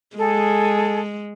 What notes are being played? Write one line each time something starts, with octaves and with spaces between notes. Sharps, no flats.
G#3 G#4 A4